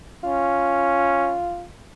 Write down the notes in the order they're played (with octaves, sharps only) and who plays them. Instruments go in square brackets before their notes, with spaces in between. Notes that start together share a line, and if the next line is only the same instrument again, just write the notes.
[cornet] C#4 [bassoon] F4